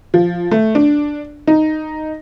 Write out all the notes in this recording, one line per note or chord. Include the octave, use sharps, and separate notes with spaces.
F3
A3
D4
D#4